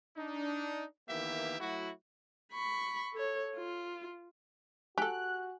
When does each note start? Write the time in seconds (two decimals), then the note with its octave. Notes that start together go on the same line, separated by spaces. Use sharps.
0.16 D4 D#4
1.09 D#3 E3 A#3 B3 G4 E5
1.60 F#3 A3 E4 F#4
2.53 B5 C#6
3.13 A4 C#5
3.56 F4
4.98 F#4 G4 A4 G#5 F#6